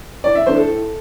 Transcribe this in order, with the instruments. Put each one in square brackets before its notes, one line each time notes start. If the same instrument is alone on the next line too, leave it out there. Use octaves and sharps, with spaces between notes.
[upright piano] A2 D5
E5
E3 A3 D4 C5
A4
A2